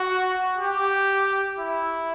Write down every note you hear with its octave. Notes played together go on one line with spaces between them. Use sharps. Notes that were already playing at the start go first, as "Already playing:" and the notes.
Already playing: F#4
G4
E4